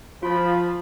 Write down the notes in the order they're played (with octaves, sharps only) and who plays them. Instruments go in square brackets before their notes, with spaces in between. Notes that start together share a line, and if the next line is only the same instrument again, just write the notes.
[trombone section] F3 [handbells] F4 [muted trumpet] B5